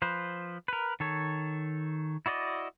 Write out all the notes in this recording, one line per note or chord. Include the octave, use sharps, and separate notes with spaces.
F3 B4 C5
A#4 B4
D#3 A4 C#5
E4 F#4 D5 D#5